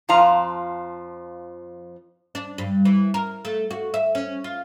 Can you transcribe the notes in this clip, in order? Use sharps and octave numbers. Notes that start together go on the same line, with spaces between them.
F2 F3 F5 A#5
D4
G2
E3
A#4
A3
F#4
E5
C#4
F4